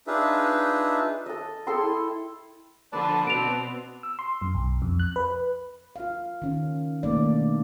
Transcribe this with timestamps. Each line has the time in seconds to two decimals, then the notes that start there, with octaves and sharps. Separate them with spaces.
0.07 D4 D#4 F4 G#4 B4 E5
1.26 A4 D#5
1.67 G#4 A4 G5 C6
1.82 E4
2.93 D3 F3 B4 D5 A5
3.27 B2 B3 C4 D7 F7
4.03 E6
4.19 C6
4.42 F#2
4.55 B1
4.82 F2
5.00 F#6
5.16 B4
5.96 F4 F5
6.42 D#3 C#4
7.03 B2 D#3 A3 A#3 D5
7.23 D4